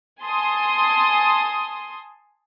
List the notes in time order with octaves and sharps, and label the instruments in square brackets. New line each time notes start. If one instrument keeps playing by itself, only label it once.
[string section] G#5 A5 C6 D#6